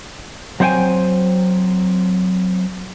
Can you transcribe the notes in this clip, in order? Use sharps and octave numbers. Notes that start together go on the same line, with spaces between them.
F#3 C4 C5 C#5 G5 G#5